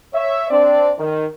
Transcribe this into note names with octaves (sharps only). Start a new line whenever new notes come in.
C#5 E5
C4 D4 D5
D#3